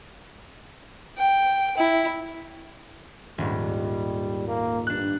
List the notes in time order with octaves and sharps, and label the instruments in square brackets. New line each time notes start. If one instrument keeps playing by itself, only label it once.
[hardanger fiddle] G5
E4
[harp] D#1 G#2 [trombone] G3
[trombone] A#3
[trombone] G2 [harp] D4 F#6